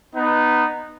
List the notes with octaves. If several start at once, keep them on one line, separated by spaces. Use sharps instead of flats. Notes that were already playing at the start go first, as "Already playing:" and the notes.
B3 D#4